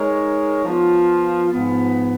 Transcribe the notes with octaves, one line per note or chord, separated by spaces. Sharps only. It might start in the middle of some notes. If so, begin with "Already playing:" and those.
Already playing: G#3 D#4 A#4 C#5
F3 B3 F4
G#2 F3 B3